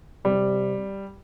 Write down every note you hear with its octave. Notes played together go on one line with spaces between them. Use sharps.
C3 G3